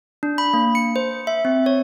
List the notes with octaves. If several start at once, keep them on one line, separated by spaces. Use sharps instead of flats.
D4
B5
A#3
C#7
C5
E5
C4
C#5